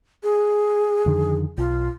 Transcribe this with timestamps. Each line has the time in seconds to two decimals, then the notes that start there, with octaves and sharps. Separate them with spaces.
0.23 G#4
1.06 F2 D3 D#3
1.58 B1 F4